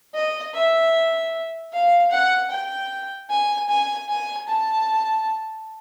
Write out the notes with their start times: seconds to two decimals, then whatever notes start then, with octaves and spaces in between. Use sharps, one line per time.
0.14 D#5
0.54 E5
1.73 F5
2.11 F#5
2.50 G5
3.30 G#5
3.69 G#5
4.09 G#5
4.47 A5